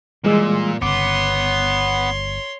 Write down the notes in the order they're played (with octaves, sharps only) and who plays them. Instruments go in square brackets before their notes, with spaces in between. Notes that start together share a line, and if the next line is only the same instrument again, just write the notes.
[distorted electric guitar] A#2 [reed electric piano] E3 G#3 E6 [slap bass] G3
[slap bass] G1 C#3 [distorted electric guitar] B3 [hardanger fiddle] C#5 C6 [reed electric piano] D6